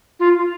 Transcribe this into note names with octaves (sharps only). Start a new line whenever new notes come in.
F4